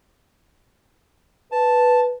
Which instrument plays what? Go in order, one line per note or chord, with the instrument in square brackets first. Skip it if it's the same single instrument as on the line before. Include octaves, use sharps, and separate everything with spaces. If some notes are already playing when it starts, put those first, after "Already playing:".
[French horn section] B4 [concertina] A5